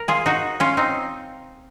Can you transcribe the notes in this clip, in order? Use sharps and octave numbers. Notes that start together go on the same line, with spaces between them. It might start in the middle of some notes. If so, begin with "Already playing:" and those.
Already playing: A#4
F4 G#4
D#4 F#4
C#4 F4
C4 D#4